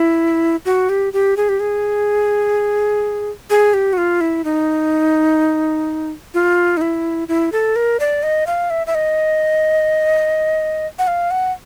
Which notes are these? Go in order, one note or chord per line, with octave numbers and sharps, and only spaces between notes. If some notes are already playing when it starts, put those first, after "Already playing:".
Already playing: E4
F#4
G4
G4
G#4
G4
G#4
G#4
G4
F#4
F4
E4
D#4
F4
D#4
E4
E4
A4
A#4
D5
D#5
F5
E5
E5
D#5
F#5
F5
F#5